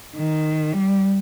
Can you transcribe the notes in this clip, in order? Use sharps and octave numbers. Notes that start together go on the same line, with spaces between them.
D#3
G3